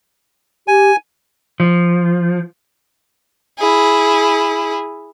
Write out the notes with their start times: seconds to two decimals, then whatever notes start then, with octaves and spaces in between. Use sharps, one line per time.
0.68 G4 G#5
1.60 F3
3.59 E4 G#4